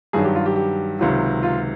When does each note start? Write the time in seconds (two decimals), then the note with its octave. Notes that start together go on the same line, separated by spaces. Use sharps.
0.13 G2 D#3 F#3 G#4
0.25 G4
0.35 F4
0.46 G4
0.56 G4
0.99 C#2 C3 D#3 F#3
1.43 F4